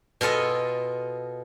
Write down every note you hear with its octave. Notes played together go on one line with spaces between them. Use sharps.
B2 F4 A4 D#5 G#5